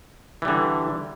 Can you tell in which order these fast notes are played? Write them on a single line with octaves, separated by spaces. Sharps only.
E3 G3 D3